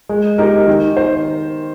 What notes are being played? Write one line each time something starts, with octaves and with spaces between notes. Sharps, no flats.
G#3
D#4 G4 A#4
D#3
C5